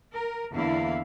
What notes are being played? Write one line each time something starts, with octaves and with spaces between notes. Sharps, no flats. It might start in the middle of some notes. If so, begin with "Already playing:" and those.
A#4
E2 D3 A#3 E4 F5